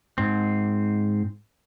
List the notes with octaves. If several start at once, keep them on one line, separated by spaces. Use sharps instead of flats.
G#2 C4